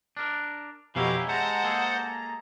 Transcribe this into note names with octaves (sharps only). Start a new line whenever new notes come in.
D4 A#4
F2 B2 E3 C#4 E4 G4 F5 A#5
G#3 C5 F#5 A5 A#5
A#3 G#4 A4